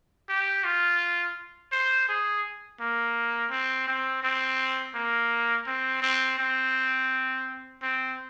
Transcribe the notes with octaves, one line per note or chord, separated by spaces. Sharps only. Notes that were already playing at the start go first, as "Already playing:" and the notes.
G4
F4
C5
G#4
A#3
C4
C4
C4
A#3
C4
C4
C4
C4